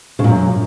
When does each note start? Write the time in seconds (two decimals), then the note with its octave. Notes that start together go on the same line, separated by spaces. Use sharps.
0.19 C#3
0.24 A#2
0.29 F#2